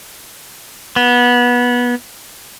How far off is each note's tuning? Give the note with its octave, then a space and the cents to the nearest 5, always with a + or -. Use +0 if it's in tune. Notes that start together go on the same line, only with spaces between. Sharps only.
B3 -20